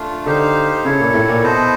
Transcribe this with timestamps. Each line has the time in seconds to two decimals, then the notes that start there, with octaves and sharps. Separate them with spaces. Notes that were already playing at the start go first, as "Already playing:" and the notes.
Already playing: A3 D4 F4
0.26 D3 D#4 G4 C5 F5
0.85 C#3 E4 A4 C#5
1.00 A#2
1.14 A2
1.28 A#2
1.43 B2 E4 A4 C5 D#5